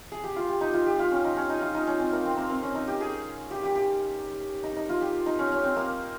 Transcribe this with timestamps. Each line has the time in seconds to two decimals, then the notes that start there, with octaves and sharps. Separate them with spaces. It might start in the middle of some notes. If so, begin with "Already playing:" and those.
0.12 G#4
0.24 G4
0.36 F4
0.49 G4
0.61 D#4
0.73 F4
0.86 G4
0.99 F4
1.12 C#4
1.25 D#4
1.37 C#4
1.50 D#4
1.62 F4
1.74 D#4
1.87 C#4
1.99 C4
2.12 A#3
2.25 C4
2.37 A#3
2.50 C4
2.63 C#4
2.75 D#4
2.88 G4
3.00 G#4
3.51 G4
3.63 G4
3.75 G4
4.63 D#4
4.76 D#4
4.89 F4
5.01 G4
5.26 D#4
5.39 C#4
5.52 C#4
5.64 C4
5.76 A#3